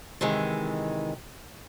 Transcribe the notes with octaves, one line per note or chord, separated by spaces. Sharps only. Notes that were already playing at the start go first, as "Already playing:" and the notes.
C3 D#3 E3 G#3